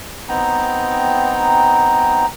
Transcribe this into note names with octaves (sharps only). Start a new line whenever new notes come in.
B3 C4 D#4 G5 A#5